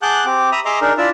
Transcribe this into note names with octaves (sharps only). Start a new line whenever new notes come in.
G#4 F#5 A5 D6 F#6 G6
C4 G4 D6
E5 A#5 B5 D#6
G#4 D#5 E5 A#5 C6 D6
D4 D#4 G#4 A#4
D4 E4 F4 D5 E5